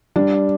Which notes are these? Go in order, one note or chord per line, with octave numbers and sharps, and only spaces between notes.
G3 D4